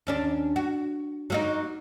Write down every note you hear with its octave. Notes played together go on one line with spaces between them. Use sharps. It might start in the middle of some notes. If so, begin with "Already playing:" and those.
D#2 C#4 D4
F#4
F#3 A#3 D#4